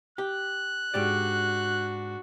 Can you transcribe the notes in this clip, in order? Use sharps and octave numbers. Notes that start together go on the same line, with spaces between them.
G4 F#6
G#2 D4 F#4 G4 D5